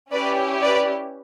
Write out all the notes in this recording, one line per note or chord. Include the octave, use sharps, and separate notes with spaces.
C#4 E4 G4 B4 D5
B4 D5